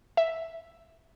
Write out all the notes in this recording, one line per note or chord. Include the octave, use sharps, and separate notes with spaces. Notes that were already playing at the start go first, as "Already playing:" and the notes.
E5